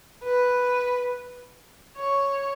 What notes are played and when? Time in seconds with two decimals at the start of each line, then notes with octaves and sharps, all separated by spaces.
0.24 B4
1.97 C#5